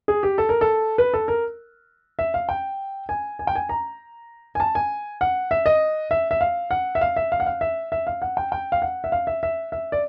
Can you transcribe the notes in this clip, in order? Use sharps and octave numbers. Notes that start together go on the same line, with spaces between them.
G#4
G4
A4
A#4
A4
B4
A4
A#4
E5
F5
G5
G#5
G#5
G5
G#5
A#5
G#5
A5
G#5
F#5
E5
D#5
E5
E5
F5
F#5
E5
F5
E5
F5
F#5
F5
E5
E5
F5
F#5
G5
G5
F5
F#5
E5
F5
E5
E5
E5
D5